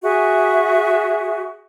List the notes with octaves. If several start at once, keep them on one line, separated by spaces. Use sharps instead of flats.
F#4 G#4 E5